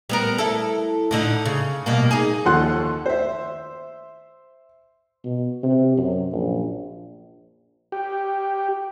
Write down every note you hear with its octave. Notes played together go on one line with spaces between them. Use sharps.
G3 B3 A#4
E4 A4
A2 D3 D#4
C#3
B2 G3 A#3
D#4 G#4
D#2 F3 A4 F#5 C6 F#6
C5 E5
B2
C3
F#2
A#1
G4